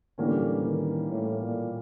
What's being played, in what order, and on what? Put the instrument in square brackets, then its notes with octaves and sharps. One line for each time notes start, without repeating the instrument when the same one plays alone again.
[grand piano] A2 E3 G3 A#3 C#4 [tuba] D3
[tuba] D#3
A2
A#2